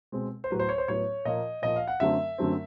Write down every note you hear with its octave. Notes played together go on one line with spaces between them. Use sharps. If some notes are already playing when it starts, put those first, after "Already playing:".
B2 G#3 C4
C5
A2 F#3 B3 B4
C5
C#5
C5
A2 F#3 B3 C#5
A#2 F3 A#3 D#5
A#2 F3 A#3 D#5
F5
F#5
F#2 D3 F#3 A3 C4 E5
F#2 D3 F#3 A3 C4